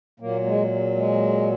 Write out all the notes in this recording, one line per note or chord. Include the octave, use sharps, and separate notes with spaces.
A#2 F#3 A#3
G#3
G#3